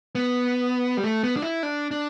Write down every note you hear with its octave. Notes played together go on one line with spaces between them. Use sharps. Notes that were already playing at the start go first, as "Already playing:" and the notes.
B3
G3
A3
B3
D4
E4
D4
D4